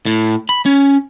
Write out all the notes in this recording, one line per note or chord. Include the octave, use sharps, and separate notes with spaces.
A2
B5
C#4